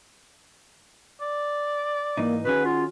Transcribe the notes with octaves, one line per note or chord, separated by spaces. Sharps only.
D5
G#2 E3 A#3 D#4
D#3 C#4 F#4 G#4 B4
F4